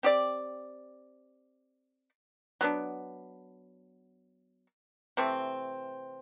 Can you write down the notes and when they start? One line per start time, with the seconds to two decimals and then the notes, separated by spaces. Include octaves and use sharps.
0.03 C4 G4 D5
2.61 F#3 B3 D4
5.17 C3 E3 A3 C4